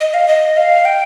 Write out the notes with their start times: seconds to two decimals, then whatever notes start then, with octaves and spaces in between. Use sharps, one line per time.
0.01 D#5
0.14 F5
0.28 D#5
0.57 F5
0.85 G5